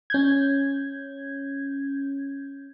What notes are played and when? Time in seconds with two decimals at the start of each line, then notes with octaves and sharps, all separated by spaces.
0.10 C#4 G6 G#6